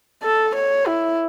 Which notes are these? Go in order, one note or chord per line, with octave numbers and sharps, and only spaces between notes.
A4
C#5
E4